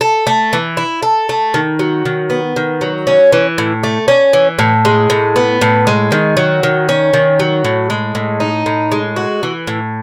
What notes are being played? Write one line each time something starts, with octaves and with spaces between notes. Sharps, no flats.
A4
A3
E3
E4
A4
A3
D#3
F#3
D#3
B3
D#3
F#3
C#4
E3
A2
A3
C#4
E3
A2
G#3
A2
B3
A2
G#3
D#3
F#3
D#3
C#4
D#3
F#3
A2
G#3
A2
D#4
A2
G#3
F#4
E3
A2